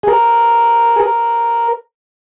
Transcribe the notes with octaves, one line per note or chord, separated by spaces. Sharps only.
G#4
A#4
G#4
A#4